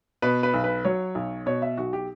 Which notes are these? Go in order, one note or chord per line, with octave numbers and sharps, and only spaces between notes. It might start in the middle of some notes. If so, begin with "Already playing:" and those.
B2 B4
B4
B1
B4
F#3 C#5
B1
B2 C#5
E5
B1 F#4
G4